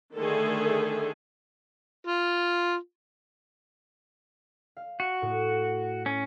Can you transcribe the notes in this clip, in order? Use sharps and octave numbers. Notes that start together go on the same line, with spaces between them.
D3 D#3 A3 G#4 A4
F4
F5
F#4
A2
C#4